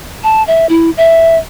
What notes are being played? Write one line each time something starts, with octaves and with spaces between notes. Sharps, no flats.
A5
E5
E4
E5